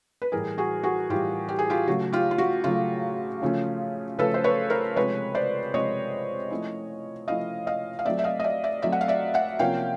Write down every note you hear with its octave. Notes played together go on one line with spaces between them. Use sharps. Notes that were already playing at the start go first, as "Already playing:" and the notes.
B4
A2 E3 G3 G#4 A#4
F#4 G#4
F#4 G#4
A2 E3 G3 F4 G4
G4
G#4
F4 G4
C#3 F#3 A3 F#4
F4 G4
F4
F#4
C#3 F#3 A3 F4
C#3 F3 A3 C#4
C#3 F3 A3 C#4 A4 B4
C5
B4 C#5
A#4 C5
C3 F3 G#3 B4 C#5
C5 D5
C3 F3 G#3 C#5 D#5
F3 A3 C#4 E4
F3 A3 C#4 E4 D#5 F5
D#5 F5
F5
F#3 A3 C4 D5 E5
E5
D#5 F5
D#5
D5 E5
D5 E5
F#3 A3 C4 D5 E5
F#5
F5
D5 E5
E5 F#5
C3 F3 A#3 C#4 F5 G5